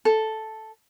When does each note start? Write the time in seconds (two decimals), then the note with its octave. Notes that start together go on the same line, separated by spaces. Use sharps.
0.05 A4